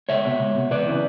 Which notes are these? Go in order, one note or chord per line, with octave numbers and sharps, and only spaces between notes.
C#2 C#5 E5
B2
C#2
B2
E2 B4 D5
C#3 E3